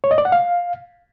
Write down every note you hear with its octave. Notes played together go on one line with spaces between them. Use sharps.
C#5
D#5
D5
F#5
F5